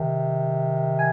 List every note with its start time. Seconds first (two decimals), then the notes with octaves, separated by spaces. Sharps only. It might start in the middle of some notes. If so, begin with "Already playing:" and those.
Already playing: C3 D#3
0.97 G#5